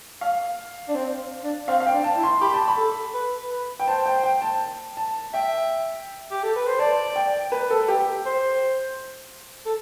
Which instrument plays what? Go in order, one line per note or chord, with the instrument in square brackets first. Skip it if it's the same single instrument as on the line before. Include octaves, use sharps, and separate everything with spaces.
[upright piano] F5
[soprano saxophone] D4
C4
D4
[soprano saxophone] C4 [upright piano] F5
[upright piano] F5
G5
[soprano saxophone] D4
[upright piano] A5
[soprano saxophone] E4
[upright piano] C6
[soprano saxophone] G4 [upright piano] B5
[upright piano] A5
B5
[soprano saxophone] A4
B4
B4
[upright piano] G5
[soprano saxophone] C5 [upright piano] A5
[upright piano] G5
G5
A5
A5
[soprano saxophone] E5 [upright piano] G5
[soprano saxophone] G4
A4
B4
C5
[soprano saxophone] D5 [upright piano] A5
[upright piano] G5
B4
A4
G4
[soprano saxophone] C5
A4